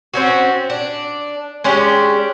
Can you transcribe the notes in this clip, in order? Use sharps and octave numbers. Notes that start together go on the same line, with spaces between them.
C4 C#4 F#4
D4
G#3 C#4 D4 G4